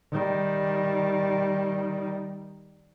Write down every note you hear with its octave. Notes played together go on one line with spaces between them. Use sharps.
D#3 G3